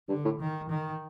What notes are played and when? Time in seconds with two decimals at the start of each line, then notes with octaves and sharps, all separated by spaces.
0.09 G2 D3
0.25 A2
0.40 D#3
0.70 D#3